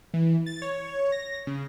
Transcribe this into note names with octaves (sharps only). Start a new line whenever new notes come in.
E3
A6
C#5
A#6
C#3